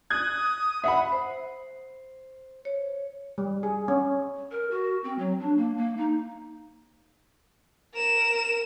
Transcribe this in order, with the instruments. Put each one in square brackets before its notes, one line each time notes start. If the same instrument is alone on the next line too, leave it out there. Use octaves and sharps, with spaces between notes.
[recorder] D#6 [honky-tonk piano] F#6 G#6
[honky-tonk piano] E5 B5 [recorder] F#5
[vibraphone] C5
C#5
[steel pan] G3
G#4
C#4
[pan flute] A#4
F#4
C4
F#3
D4
A#3
A#3
D#4
[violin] A#4 E7